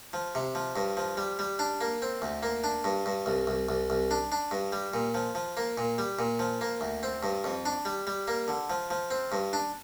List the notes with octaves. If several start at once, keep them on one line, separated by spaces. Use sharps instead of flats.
F3
C3
F3
G2
F3
G3
G3
D4
A#3
C4
D2
A#3
D4
G2
G2
C2
C2
C2
C2
D4
D4
G2
G3
A#2
F3
F3
A#3
A#2
G3
A#2
F3
A#3
D2
C4
G2
F2
D4
G3
G3
A#3
D3
F3
F3
C4
G2
D4